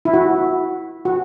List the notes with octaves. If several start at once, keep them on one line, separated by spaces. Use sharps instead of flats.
E4
F#4
F#4